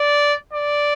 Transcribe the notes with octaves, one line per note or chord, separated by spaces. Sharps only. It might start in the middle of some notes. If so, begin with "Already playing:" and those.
Already playing: D5
D5